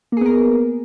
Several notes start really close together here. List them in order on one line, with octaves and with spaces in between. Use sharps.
A#3 G#4 B3 A#4